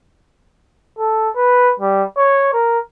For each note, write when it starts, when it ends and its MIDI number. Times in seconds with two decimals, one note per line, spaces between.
0.99 1.29 69
1.36 1.72 71
1.80 2.03 55
2.18 2.52 73
2.54 2.79 70